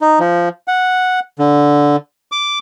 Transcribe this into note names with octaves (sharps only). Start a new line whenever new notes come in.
D#4
F3
F#5
D3
D6